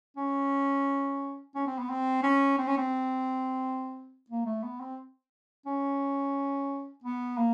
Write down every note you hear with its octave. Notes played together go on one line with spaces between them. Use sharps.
C#4
C#4
C4
B3
C4
C#4
C4
C#4
C4
A#3
A3
B3
C4
C#4
B3
A#3